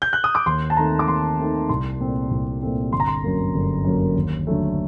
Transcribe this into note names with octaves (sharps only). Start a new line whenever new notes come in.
G6
F#6
D#6
D6
D#2 C6
A5
D#3 A3 C4 A#5
D6
D#2 C6
D#3 A3 C4
C2 C6
A#2 A3 C4
C2
A#2 A3 C4
G1 C6
A#5
C6
F#2 F#3 A#3
G1
F#2 F#3 A#3
D#2
D3 F#3 A3